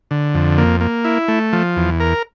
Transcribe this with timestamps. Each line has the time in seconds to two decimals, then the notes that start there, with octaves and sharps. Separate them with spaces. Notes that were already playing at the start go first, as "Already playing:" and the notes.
0.11 D3
0.34 F2
0.58 A#3
0.81 A#3
1.05 E4
1.28 A3
1.53 F3
1.77 E2
2.00 A#4